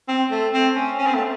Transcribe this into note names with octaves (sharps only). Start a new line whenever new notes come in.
C4
A3
C4
C#4
C#4
C4
A3